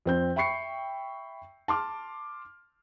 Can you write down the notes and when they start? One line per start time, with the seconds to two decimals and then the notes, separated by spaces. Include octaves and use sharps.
0.06 F2 C4 G6
0.36 E5 G5 B5 C#6 C7 C#7
1.68 A5 C6 D6 F6